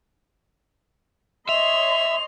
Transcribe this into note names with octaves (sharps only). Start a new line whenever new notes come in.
C#5 D#5 E5 C6 F7